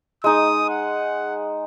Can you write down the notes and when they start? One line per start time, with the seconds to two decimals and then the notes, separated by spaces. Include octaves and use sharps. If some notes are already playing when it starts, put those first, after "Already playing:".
0.24 G#3 D#4 D#6
0.70 F#5